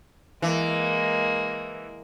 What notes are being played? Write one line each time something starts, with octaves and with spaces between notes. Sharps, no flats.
E3 G#3 A#3